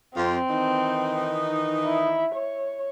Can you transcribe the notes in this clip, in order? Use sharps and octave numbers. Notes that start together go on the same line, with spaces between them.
F2 C4 F4
D#3 E3 D#4
E4
C#5